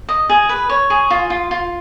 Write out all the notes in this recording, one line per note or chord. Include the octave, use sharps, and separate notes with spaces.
D#5
G#4
B4
C#5
G#4
F4
F4
F4